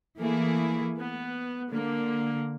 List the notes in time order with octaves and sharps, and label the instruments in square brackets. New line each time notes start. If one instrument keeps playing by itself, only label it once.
[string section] E3 A3 A#3 E4 G#4
B3
D3 A#3